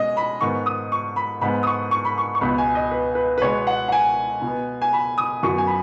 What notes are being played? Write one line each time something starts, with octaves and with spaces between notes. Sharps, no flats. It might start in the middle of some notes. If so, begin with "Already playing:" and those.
Already playing: B2 G#3 C#4 D#5
B5
G#2 D#3 B3 C#6
D#6
C#6
B5
G#2 G#3 B3 B5
D#6
C#6
C#6
B5
C#6
C#6
C#2 B2 B3 B5
G#5
D#5
B4
B4
B4
B2 G#3 B3 C#5
F#5
F#5
G#5
B2
B3
G#5
B5
D#6
F#2 F#3 B3 C#6
G#5
B5